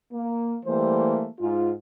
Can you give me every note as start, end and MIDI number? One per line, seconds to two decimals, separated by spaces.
0.12 0.55 58
0.66 1.26 52
0.66 1.26 55
0.66 1.26 57
0.66 1.26 58
0.66 1.26 72
1.39 1.70 44
1.39 1.70 65